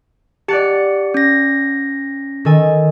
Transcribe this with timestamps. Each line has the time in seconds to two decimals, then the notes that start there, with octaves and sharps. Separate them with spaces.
0.48 G4 D5 F#5 A5 C#7
1.14 C#4 A#6
2.45 D#3 A4 G#5